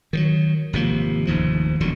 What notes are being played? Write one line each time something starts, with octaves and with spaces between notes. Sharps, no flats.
D#3 E3 F#3
G#1 C3 F3 A#3
F1 D#2 G#2 F3
E1 D2 D3 F#3